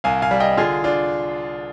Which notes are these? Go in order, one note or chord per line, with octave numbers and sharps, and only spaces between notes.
C2 F5 G#5
F5 G#5
G3
D#5 G5
D3 F4 G#4
D4 F4